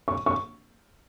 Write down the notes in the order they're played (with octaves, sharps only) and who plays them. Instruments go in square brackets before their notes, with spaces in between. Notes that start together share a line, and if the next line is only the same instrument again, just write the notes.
[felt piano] C#6
C#6